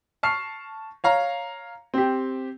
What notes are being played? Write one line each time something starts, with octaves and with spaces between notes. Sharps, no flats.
A5 C#6 F6 C7
C#5 F5 A#5
C4 G4